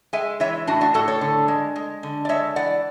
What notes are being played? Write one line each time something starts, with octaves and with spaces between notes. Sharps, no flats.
G#3 E5 G#5
E3 C#5 E5
A2 D4 F#4
D4 F#4
A2 F#4 A4
A4 C#5
D3
G#3
G#3
D3
D5
G#3 C#5 E5
E3 D5 F#5